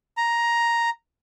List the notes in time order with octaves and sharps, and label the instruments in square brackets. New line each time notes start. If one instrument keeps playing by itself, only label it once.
[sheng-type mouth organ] A#5